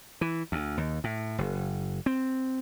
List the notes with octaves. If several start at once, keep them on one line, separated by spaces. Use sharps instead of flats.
E3
D2
D#2
A2
F#1
C4